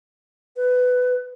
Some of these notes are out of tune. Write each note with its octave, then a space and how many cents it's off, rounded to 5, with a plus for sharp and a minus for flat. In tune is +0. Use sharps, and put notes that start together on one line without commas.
B4 +15